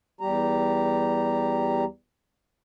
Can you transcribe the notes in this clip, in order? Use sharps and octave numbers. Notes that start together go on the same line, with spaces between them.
E2 G3 G4 A#5